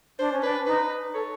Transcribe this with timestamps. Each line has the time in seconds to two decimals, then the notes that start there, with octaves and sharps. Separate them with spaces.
0.19 D4 C5
0.32 C#4
0.43 D4 B4
0.66 D#4 B4
1.14 A4 C#5